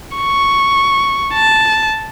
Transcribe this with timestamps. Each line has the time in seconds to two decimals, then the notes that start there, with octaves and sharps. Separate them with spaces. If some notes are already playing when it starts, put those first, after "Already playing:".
0.17 C#6
1.34 A5